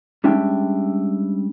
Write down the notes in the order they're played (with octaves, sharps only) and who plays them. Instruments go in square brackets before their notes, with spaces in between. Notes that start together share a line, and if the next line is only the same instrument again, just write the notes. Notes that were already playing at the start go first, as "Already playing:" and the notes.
[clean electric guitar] G3 G#3 C#4 D4 E5 G5